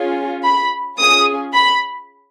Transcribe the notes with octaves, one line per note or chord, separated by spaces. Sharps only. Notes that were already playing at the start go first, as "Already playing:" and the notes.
Already playing: C#4 F4 G#4
B5
C#4 F4 G#4 D#6
B5